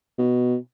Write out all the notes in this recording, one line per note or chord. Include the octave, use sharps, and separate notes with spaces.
B2